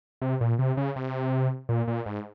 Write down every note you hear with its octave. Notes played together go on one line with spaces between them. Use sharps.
C3
A#2
C3
C#3
C3
A#2
A#2
G#2